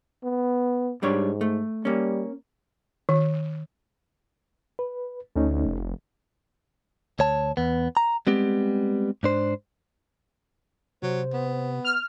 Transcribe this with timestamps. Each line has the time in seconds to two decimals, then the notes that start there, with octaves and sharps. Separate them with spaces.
0.24 B3
1.03 G#2 G3 D4 C#5
1.41 A3
1.85 G3 A#3 C#4
3.09 D#3
4.79 B4
5.36 D2 A3 C#4 D#4
5.66 F1
7.19 D2 C#5 A5
7.57 E2 B3
7.97 A#5
8.27 G3 G#3 B3 C4 G4
9.23 G#2 D4 C5
11.03 C3 F#3 C5
11.33 B3
11.85 F6